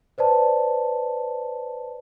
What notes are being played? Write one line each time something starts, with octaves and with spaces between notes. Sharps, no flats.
B4 C5 D5 A5